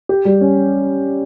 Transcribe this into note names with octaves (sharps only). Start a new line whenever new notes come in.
G4
G3
C#4